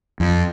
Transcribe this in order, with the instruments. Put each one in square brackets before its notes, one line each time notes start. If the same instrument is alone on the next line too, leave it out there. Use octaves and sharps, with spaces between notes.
[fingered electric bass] F2